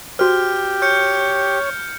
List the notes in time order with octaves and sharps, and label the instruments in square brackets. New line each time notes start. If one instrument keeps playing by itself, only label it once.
[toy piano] F#4 C5 [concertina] G4 [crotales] F6
[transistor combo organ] C#5 [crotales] F6 G6 C#7